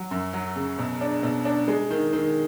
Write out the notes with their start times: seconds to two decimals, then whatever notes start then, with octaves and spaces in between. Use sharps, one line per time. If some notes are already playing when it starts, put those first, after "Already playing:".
Already playing: F#3
0.11 F#2
0.33 F#3
0.56 C#3
0.78 B2
1.01 D4
1.23 B2
1.45 D4
1.68 G#3
1.90 D#3
2.13 D#3